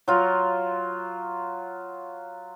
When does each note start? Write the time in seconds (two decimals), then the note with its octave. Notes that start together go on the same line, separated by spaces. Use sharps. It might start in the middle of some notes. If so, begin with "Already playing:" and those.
0.08 F#3 F4